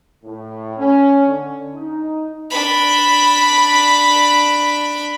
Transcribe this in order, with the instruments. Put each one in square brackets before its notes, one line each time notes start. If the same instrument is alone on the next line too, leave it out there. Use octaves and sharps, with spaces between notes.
[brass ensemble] A2
C#4
D3
D#4
[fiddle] D4 B5